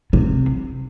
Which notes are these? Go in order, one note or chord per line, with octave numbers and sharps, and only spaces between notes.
C3